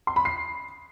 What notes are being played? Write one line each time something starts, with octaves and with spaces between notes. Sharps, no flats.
C6
B5
C7